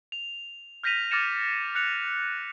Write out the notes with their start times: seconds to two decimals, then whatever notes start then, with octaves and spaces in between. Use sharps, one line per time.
0.12 F7
0.84 F6 G6 A#6 B6 D#7 F7
1.11 D6 F6 A6 A#6 C#7 E7
1.75 F#6 C#7 F7